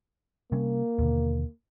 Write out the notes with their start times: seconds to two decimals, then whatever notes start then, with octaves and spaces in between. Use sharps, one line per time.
0.52 C3 G3 A#3 C#4
0.99 D#2 B2 D3